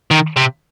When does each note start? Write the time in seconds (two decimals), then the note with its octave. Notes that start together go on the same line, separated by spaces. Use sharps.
0.11 D#3
0.36 C3